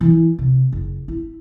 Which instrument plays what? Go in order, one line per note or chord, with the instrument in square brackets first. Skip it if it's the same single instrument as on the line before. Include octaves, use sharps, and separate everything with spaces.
[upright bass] E3 E4
C3
F#1
E4